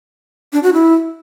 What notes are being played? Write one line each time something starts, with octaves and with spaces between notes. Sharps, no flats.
D4
F#4
E4